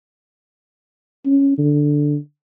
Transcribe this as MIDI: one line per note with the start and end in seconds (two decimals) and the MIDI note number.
1.26 1.55 61
1.58 2.17 50